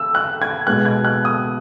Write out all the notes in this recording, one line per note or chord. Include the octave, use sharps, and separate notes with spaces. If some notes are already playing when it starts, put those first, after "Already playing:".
Already playing: E6
F#6
G#6
B2 G#3 B3 F#6
G#6
F#6
D#6